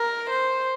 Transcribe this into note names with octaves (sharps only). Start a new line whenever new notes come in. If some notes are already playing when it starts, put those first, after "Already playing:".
Already playing: A#4
C5